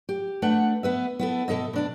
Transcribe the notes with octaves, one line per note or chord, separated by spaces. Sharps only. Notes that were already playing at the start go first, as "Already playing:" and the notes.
G4
A3 D4 B4 F#5
B3 B4 E5
B3 E4 A4
B2 G3 A4 D#5 E5
B2 D4 A5